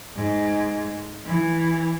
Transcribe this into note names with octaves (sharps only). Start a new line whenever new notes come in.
G#2
E3